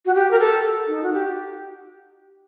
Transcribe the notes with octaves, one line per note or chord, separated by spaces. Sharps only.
F#4
G4
A#4
A4
D#4
F#4
G4